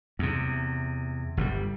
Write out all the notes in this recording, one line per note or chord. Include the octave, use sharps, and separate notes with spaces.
E2 C3
G1 A#2 G3